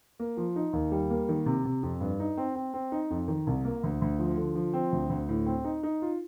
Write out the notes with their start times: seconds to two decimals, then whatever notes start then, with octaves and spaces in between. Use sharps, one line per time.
0.20 A#3
0.37 F3
0.56 D#4
0.73 D#2
0.92 G3
1.10 A#3
1.29 D#3
1.46 C3
1.65 C3
1.83 F2
2.00 G2
2.20 D#4
2.37 C4
2.55 C4
2.74 C4
2.92 D#4
3.10 F2
3.28 D#3
3.47 C2
3.65 A#3
3.83 D2
4.02 D2
4.19 F3
4.37 D3
4.55 F3
4.73 C4
4.92 D2
5.10 D2
5.29 A2
5.46 C4
5.64 D#4
5.83 D#4
6.02 F4